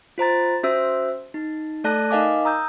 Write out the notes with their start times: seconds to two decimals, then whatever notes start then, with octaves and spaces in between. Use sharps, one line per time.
0.18 F4 C5 A#5 A6
0.63 C#4 F#4 C5 E5 E6
1.34 D#4
1.84 A3 A4 D5 A5 F#6 A#6
2.11 D#4 A#4 D#5 F5 G#5 D6
2.45 A#5 D#6 E6 G6